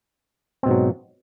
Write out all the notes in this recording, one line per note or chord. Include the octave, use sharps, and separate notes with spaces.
G#2 B2 F#3 C4